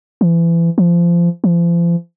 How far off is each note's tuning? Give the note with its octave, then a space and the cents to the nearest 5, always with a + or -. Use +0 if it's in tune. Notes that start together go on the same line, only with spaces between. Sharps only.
E3 +30
F3 -25
F3 -40